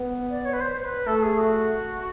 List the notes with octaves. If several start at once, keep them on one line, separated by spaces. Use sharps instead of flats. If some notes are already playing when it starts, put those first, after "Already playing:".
Already playing: B3
D5
C#5
B4
C5
C5
B4
A3 A4
G#4
F#4